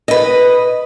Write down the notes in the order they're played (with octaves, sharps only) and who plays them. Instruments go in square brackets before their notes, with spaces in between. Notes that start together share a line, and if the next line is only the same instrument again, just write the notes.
[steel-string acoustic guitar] B4 D#5